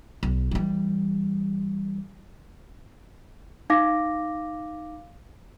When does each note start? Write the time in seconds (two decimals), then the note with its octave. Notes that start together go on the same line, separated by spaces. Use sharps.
0.23 B1
0.51 E3 G3
3.70 D#4 F5 D6 A#6